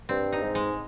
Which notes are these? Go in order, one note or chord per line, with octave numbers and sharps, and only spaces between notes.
G2 C4
D#4
G#2
G#3